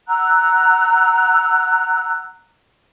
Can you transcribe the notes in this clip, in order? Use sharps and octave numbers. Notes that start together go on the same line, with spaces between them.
F#5 A#5 E6 F#6